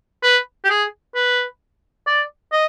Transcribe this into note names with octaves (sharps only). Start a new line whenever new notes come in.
B4
G4
G#4
B4
D5
D#5